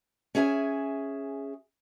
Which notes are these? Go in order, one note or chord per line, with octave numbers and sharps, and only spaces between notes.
C#4 G#4 E5 G#5